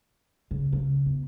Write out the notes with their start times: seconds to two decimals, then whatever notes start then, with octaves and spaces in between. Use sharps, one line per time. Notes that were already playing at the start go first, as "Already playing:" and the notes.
0.51 C#3
0.73 C#3
1.06 E2